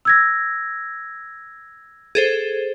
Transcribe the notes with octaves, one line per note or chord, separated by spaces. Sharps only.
E6 G#6 A#6
G#4 A4 C5